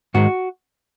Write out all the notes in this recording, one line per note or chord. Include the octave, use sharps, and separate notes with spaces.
G#2 D#3 G#3 F#4